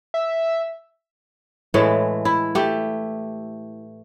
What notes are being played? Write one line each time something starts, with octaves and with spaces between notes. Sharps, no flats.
E5
A2 E3 G#3 A3
E4
A3 G4